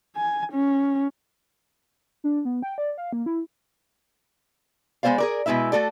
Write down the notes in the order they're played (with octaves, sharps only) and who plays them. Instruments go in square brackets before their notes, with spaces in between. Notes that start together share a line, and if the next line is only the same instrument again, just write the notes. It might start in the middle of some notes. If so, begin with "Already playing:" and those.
[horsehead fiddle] G#5
C#4
[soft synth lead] D4
B3
G5
D5
F5
A#3
E4
[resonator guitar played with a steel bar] G#3 B3 C4 C5 D5 F5
G#4 A#4 D5
B2 G#3 E4 B4 E5
A3 F#4 A4 D5